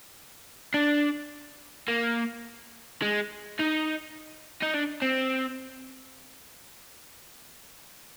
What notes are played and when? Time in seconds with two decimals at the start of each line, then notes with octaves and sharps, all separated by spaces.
0.74 D4
1.88 A#3
3.02 G#3
3.59 D#4
4.63 D#4
4.74 D4
5.02 C4